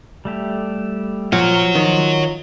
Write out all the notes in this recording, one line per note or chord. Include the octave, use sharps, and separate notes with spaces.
G3 A3 G4
A#2 F3 C#5 F#5 F6
D#3 F4